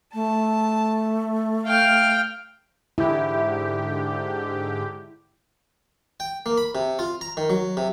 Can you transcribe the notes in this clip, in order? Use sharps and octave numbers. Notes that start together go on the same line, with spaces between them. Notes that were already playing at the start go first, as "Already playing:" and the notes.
A3 A5
F5 G5 F6
G#2 D3 E4 G4
G5
A#3
B5
C3
F4
A#5
D#3
F#3
C3